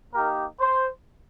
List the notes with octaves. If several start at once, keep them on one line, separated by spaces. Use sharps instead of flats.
A#3 D#4 G4 A#4
C5